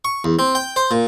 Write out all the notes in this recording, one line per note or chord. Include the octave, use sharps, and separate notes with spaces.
C#6
E2
C4
G5
C5
A#2